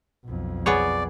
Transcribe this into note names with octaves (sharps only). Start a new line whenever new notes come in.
B1 F2
B3 G#4 C#5 D5